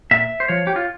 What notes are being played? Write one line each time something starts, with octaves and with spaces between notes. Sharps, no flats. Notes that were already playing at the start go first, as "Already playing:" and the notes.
A#2 E5
C5
F3 C#5
G4
F4